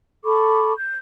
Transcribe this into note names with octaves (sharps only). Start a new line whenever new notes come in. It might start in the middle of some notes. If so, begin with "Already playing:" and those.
A4 B5 C#6 D6
G6